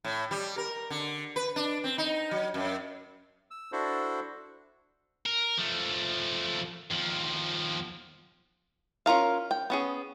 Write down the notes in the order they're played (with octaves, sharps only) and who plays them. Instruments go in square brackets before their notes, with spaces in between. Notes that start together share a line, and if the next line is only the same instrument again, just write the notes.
[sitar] A2
G3
A#4
D3
B4
D4
C4
D#4
F#3
F#2
[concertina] E6
D4 E4 F#4 A4 C5
[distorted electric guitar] A#4
F3 A3
D#2 F3
[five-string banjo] C#4 F4 A#4 F5
G5
B3 C#4 G#4